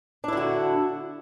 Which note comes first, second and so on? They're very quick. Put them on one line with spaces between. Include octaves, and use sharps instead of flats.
D4 E4 D3 F#4